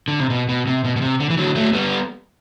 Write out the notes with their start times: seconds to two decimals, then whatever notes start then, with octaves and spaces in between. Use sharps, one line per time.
0.08 D3
0.20 C3
0.30 B2
0.49 B2
0.67 C3
0.84 B2
0.96 B2
1.02 C3
1.20 D3
1.30 E3
1.38 D3 F#3
1.56 F#3 A3
1.73 G3 B3